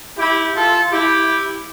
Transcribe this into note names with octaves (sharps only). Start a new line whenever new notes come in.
E4 G4
F4 A4
E4 G4